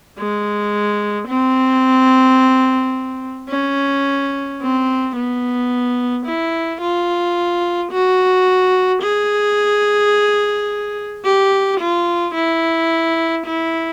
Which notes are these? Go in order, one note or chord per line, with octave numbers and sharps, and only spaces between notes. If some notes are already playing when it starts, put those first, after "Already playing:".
G#3
C4
C#4
C4
B3
E4
F4
F#4
G#4
G4
F4
E4
E4